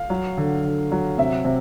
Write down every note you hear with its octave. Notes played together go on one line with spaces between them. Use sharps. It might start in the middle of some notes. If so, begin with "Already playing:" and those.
Already playing: F5
F#3
D3
D3
F#3
C3 E5
C3